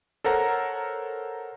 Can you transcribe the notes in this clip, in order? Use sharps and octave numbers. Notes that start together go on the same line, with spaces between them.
A4 A#4 C5 C#5 F#5 A#5